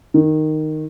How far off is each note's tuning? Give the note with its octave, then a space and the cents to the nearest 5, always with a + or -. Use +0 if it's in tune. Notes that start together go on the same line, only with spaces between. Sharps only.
D#3 -5